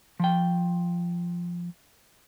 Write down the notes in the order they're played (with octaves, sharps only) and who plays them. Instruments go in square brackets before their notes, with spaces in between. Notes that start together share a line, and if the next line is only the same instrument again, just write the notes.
[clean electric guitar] F3 G5